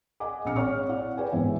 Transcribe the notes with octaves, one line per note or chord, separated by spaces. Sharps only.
D#5 F#5 G#5 D6
A#1 F2 C#4 F#5 F6 C#7
G#1 C#5 C#6 F6
E4 D5 F#5
B4 C#5 D5 G5 G#5
G1 E2 G#2 E3 C5 E5